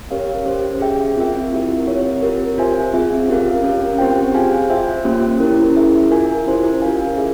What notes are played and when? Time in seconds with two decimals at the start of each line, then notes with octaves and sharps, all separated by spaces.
0.11 C#4 G4 A#4 C#5 F5
0.46 C#4 G4 C5
0.81 G#4 E5 G5
1.16 C4 F4 A#4 E5
1.52 C4 E4 G4 A#4 E5
1.87 C4 F4 A#4 C#5
2.22 C4 G4 A#4
2.58 F4 C5 E5 G#5
2.93 C4 F4 G#4 E5
3.28 C#4 G4 A#4 F5
3.64 C#4 F4 A#4 F5
3.98 C4 G4 C5 G5
4.34 F4 G#4 C5 F5 G#5
4.70 F4 C5 E5 G5
5.05 A#3 C#4 G4 C5 G5
5.40 C#4 E4 A#4
5.76 E4 G#4 E5
6.11 F4 A#4 E5 G#5
6.46 C#4 E4 G4 C5
6.82 C#4 F4 A#4 F5 G#5
7.17 G#4 E5